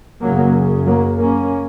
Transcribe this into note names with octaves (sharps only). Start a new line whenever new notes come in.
F#2 C#3 F#3 A#3
F#3 A#3
A#3 C#4